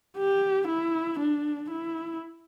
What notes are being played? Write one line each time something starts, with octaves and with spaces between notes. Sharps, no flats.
G4
E4
D4
E4